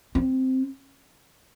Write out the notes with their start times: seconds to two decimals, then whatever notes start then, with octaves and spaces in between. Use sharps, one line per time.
0.15 C4